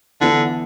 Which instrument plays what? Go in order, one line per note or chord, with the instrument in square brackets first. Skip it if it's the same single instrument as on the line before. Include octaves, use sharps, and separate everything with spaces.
[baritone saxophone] D3 [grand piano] E3 B3 E4